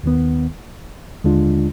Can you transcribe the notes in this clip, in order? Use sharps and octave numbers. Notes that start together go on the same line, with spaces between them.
D#2 D#3 B3
D#2 D3 G#3 D4 F4